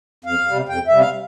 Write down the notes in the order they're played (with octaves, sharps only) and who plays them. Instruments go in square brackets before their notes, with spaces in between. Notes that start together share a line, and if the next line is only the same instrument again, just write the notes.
[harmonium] F2 F5
C3 G3
F2 G5
C3 G3 E5
F5